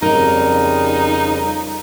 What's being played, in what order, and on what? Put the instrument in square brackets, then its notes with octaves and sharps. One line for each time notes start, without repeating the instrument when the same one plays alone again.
[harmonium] F2 C#3 G3 [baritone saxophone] D#4 [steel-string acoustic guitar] A#4 D#5